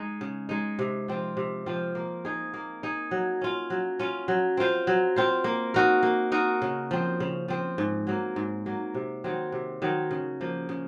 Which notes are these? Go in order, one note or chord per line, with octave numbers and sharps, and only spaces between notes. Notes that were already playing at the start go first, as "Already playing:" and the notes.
Already playing: G#3 D#4
C#3
G#3 D#4
C3
F3 C4 F4
C3
F3 C4 F4
A#3
D#4 G#4
A#3
D#4 G#4
F#3
C#4 F4
F#3
C#4 F4
F#3
C4 F4 C5
F#3
C4 F4 C5
A#3
D#4 F#4 A#4
A#3
D#4 F#4 A#4
C#3
F3 C4
C#3
F3 C4
G#2
F#3 A#3
G#2
F#3 A#3
C3
D#3 F#3 C4
C3
D#3 F#3 C4
C#3
F3 A#3
C#3